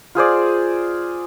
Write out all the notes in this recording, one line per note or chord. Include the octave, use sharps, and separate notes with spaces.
F4 G#4 C5 D5